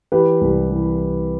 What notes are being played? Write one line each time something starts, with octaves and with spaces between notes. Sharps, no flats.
E3 G4 B4
C2
E3